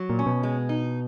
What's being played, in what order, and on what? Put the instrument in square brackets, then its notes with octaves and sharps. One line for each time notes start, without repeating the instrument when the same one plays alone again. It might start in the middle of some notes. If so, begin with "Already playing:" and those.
Already playing: [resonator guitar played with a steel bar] F#3
[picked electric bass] A#2
[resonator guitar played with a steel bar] C#4
[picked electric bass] B2
[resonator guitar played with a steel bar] G#3
D#4